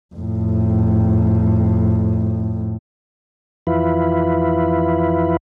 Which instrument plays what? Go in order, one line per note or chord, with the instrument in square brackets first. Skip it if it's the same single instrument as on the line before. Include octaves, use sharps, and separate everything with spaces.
[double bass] F2 A2
[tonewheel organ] F2 E3 E4 F4 B4